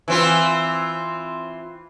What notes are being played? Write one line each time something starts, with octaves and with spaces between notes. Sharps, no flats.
E3 C4 F4